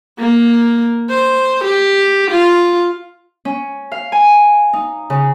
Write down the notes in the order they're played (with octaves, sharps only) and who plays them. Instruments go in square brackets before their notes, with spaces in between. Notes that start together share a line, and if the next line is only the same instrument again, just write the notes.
[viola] A#3
C5
G4
F4
[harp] C#4
F5
G#5
D#4
C#3